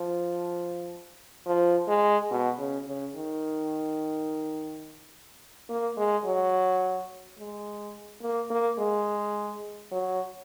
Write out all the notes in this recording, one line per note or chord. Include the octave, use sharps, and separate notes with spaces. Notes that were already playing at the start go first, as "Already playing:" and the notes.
Already playing: F3
F3
G#3
B2
C#3
C#3
D#3
A#3
G#3
F#3
G#3
A#3
A#3
G#3
F#3